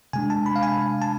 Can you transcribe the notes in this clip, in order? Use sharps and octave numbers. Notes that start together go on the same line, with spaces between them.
C3 G#3 D4 G#5
A5
B5
F5
G#5
A5